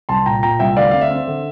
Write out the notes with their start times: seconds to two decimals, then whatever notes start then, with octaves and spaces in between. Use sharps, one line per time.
0.09 C2 A5 C6
0.26 A#2 G5 A#5
0.43 A#2 G5 A#5
0.59 C2 E5 G5
0.77 D2 D5 F5
0.91 C4 F5
1.01 E5
1.10 C4
1.27 D3